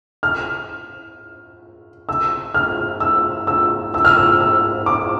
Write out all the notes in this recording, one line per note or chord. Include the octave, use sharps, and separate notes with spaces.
F6
E6
F6
E6
E6
E6
F6
E6
E6
D6